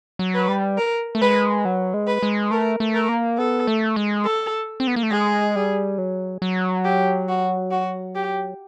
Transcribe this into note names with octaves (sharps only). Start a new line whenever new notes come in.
F#3
B4
G3
A#4
A3
G#3 B4
F#3
G#3
B4
G#3
A3 A#4
A3
A#4
A#3
B3 A4
A3
G#3
A4
C4
B3
A#3
A3
G#3 G#4
G3
F#3
F#3
G4
F#4
F#4
G4